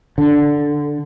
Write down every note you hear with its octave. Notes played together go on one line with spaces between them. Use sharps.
D3